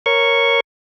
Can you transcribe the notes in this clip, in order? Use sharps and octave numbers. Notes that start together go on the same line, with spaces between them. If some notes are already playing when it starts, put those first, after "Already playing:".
A#4 C#5 C#6